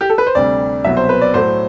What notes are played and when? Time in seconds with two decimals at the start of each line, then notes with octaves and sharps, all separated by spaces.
0.01 G4
0.10 A4
0.18 B4
0.27 C5
0.35 D2 C3 G3 D5
0.84 C2 B2 F#3 E5
0.97 C5
1.09 B4
1.21 D5
1.34 A2 F#3 A3 C5